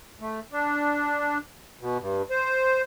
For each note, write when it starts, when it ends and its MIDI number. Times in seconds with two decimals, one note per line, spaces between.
0.20 0.40 57
0.52 1.38 62
1.81 1.98 47
2.00 2.22 43
2.31 2.82 72